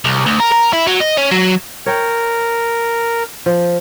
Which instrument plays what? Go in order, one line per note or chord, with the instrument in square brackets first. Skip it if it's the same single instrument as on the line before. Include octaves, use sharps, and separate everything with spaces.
[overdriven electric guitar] C2
D2
A#4
A#4
E4
F#3
D#5
C#4
F#3
[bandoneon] A#4 [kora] C#5 G5
[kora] F3